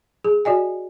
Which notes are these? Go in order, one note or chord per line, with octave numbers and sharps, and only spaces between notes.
G#4
F#4 D5 D#5 G#5